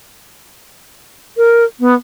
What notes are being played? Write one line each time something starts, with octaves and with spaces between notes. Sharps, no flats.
A#4
B3